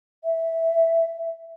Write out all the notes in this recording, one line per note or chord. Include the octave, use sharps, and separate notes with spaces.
E5